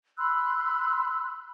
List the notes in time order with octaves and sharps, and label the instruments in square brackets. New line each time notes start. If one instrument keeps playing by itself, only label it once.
[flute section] B5 C6 E6 F#6